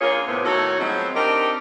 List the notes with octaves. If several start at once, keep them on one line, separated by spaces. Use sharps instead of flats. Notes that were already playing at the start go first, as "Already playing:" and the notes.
D3 A#3 F4 G#4 A#4 C#5
A2 C3 B3
A2 D#3 F#4 A4 C#5
F3 F#3 G#3 B3 C4
C4 D4 D#4 G4 A#4